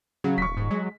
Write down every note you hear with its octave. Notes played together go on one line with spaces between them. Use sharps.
C#3 F#3
D#1 C#6 B6
G#2
F#3 G#3